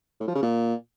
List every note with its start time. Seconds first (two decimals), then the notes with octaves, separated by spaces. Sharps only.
0.20 A2
0.27 F3
0.35 C#3
0.43 A#2